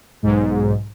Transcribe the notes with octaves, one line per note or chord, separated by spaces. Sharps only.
B1 G#2